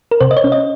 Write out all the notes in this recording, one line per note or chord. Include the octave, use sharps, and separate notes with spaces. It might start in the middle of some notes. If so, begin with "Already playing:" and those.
A#4
C3 C5
D#5
C#5
C#4
D#5